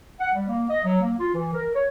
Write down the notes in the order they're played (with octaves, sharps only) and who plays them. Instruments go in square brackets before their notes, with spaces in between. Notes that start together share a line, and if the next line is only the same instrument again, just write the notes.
[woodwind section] F#5
G3
A#3
D#5
F#3
A#3
F4
E3
A#4
C#5